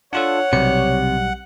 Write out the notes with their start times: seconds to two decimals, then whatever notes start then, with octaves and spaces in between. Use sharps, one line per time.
0.13 D4 F4 A4 C#5 F#5
0.53 B1 C3 G3 C#7